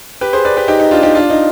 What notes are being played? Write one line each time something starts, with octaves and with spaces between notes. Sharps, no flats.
G4 B4
G#4 C5
B4 D5
G4 B4
D#4 G4
D#4
D4 F4
D#4 G4
D4 F4
D#4